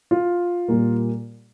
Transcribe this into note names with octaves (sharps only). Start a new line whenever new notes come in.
F4
A#2 G3 A#3